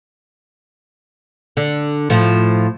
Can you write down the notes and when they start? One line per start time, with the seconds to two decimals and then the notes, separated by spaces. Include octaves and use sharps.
1.57 D3
2.10 A2 F3